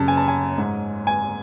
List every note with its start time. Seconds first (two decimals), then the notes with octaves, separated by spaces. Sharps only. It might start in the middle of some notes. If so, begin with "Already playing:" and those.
Already playing: F#2 C#3 A5
0.08 G#5
0.17 A5
0.28 G#5
0.58 G#2
1.07 G#5